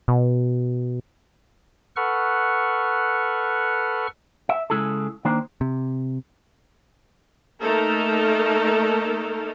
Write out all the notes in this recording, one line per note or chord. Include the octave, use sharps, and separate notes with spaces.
B2
A4 B4 F#5 C#6 F6
E5
C#3 G3 G#3 E4 G#4 A4
D#3 A#3 D4 C5
C3
A3 A#3 D#4 A4 A#4